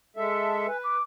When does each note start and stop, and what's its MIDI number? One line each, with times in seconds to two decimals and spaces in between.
0.17 0.67 56
0.17 0.67 69
0.17 0.67 76
0.30 0.60 81
0.68 0.97 71
0.68 0.77 80
0.84 1.02 86